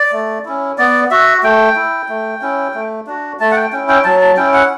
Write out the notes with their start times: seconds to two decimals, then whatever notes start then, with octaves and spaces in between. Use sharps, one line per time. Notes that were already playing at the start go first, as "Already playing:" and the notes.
Already playing: D5
0.13 A3
0.45 C#4 E4
0.78 B3 D5
1.11 F#4 E5
1.43 A3 G5
1.76 E4
2.09 A3
2.42 C#4 E4
2.74 A3
3.07 D4 F#4
3.40 A3 A5
3.51 F#5
3.56 G5
3.72 C#4 E4 G5
3.89 G5
4.04 F#3 A5
4.21 A5
4.37 C#4 E4 G5
4.54 F#5